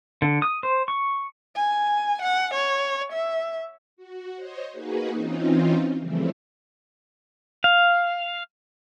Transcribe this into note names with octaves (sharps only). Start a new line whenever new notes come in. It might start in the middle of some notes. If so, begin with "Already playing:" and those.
D3
D#6
C5
C#6
G#5
F#5
C#5
E5
F#4
C5 C#5 D#5
A#3 D#4 F#4 G#4 B4
E3 C4 C#4 D#4 F4
C#3 E3 F3 G3 A3 C4
F5